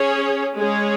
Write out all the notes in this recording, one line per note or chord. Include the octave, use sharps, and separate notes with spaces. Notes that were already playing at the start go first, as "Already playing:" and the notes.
Already playing: C#4 G#4 C#5
G#3 C#4 G#4 C#5